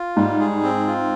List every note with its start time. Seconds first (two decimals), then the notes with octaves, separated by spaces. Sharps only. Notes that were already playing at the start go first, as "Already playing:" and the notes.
Already playing: F4
0.16 G#2 G3
0.40 G#4
0.63 C4
0.87 F4